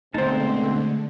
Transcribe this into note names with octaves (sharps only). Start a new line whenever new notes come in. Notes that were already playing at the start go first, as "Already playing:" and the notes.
B2 D3 G#3 A3 C4 D#4 C5 A5